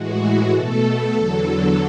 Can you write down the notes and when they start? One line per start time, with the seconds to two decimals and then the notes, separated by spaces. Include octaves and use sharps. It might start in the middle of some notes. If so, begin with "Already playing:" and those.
Already playing: A2 E3 G#3 F#4
0.51 B2 A3 A4
1.14 E2 D3 F#3